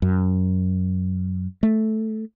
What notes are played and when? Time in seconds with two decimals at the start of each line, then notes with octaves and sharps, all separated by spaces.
0.02 F#2
1.63 A3